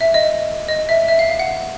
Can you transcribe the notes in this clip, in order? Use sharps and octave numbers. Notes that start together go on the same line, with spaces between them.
E5
D#5
D#5
E5
E5
F5
F5
F#5